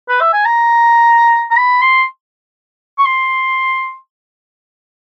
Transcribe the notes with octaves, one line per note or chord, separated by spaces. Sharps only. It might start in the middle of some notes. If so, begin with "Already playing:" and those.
B4
E5
G#5
A#5
A#5
B5
C6
C#6
C6